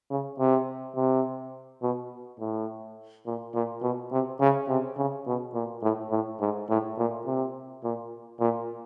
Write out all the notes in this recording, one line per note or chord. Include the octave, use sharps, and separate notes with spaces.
C#3
C3
C3
B2
A2
A#2
A#2
B2
C3
C#3
C3
C#3
B2
A#2
A2
A2
G#2
A2
A#2
C3
A#2
A#2